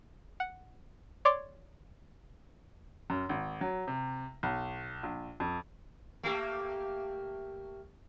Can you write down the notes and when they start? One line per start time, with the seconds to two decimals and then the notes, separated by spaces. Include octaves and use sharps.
0.40 F#5
1.25 C#5 D5 C6 D6
3.10 F#2
3.29 G#1
3.61 F#3
3.88 C3
4.43 B1
5.03 A#1
5.40 F2
6.23 A3 A#3 G4